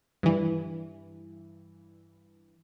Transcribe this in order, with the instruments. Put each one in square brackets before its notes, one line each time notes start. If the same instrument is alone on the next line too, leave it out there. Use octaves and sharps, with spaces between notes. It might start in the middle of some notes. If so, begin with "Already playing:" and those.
[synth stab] G2 E3